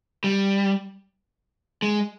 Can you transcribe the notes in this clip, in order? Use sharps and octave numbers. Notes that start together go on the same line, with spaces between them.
G3
G#3